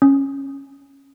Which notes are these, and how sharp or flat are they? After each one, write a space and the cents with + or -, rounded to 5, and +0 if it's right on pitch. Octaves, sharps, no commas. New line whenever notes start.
C#4 -10